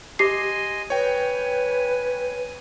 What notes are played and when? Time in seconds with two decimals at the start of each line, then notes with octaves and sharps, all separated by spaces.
0.19 G4 D#5 G#5 C6 C7
0.90 B4 C#5 G5 G#5